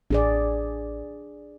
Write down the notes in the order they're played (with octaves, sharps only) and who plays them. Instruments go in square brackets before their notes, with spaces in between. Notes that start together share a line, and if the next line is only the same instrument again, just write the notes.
[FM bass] A1 [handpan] D4 G#4 D5